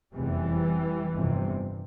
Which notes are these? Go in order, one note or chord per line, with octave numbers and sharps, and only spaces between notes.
F1 E2 C3 E3 G3
G1 F2 C3